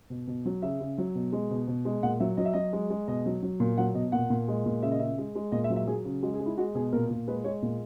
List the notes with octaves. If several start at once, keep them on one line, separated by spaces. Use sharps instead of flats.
B2
B2
F#3
C#3 E5
C#3
F#3
B2
G#3
B2
B2
G#3
A#2 F#5
F#3 E5
F#3 D#5
E5
F#3 D#5
G#3
G#3
B2 D#5
F#3
F#3
A#2
F#3 F#5
B2 D#5
A#2 F#5
A#2
G#3
A#2
C#3 E5
D#5
C#3 E5
G#3
G#3
A#2 D#5
E5
F#3
E5
F#3 G#4
C#3
G#3 F#4
G#4
G#3
E4
G#3 F#4
B2 G#4
A#2 A#4
A#2
G#3 B4
G#3 C#5
A#2